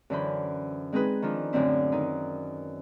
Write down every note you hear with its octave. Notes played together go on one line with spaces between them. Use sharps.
F#2 D3 E3 C#4 C5 B5
G#3 C4 D#4 G#4 B4
D#3 F3 D4 F4
F#2 A2 D3 C4 E4
D#3 D#4